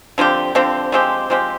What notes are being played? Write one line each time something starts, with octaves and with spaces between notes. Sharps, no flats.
D3 F3 C4 G4
D3 F3 C4 G4
F3 G#3 C4 G4
F3 G#3 C4 G4